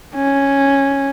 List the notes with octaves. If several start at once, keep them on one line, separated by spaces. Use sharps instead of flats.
C#4